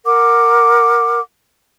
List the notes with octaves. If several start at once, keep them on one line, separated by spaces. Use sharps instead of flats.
A#4 F#5 D6